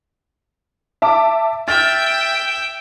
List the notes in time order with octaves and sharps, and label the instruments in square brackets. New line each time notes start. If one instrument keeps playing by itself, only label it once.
[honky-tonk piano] E5 A5 D6
[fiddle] E5 G5 [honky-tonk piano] F6 A6